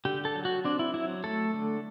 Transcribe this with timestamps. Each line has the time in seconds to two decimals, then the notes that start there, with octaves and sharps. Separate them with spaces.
0.05 D3 G4
0.25 A4
0.35 F#3
0.45 F#4
0.65 C4 D4
0.79 E4
0.94 F#3 E4
1.24 A3 A4
1.54 D3